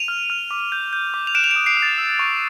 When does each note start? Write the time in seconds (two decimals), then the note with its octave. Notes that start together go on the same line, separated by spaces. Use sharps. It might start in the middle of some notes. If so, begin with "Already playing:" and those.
Already playing: D#7 F7
0.08 F6
0.30 F6
0.51 D6
0.72 G6
0.93 G6
1.14 D6
1.27 F7
1.35 F#6 D7 E7
1.44 F7
1.51 D7 E7
1.56 D#6
1.66 C7 D7
1.77 F#6
1.82 A6
1.98 E6
2.19 C#6